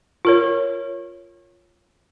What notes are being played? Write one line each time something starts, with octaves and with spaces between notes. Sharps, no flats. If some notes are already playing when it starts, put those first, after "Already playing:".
F4 A#4 C#5